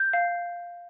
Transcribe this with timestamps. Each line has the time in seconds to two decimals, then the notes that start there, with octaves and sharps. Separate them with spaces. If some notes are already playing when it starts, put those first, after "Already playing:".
Already playing: G6
0.13 F5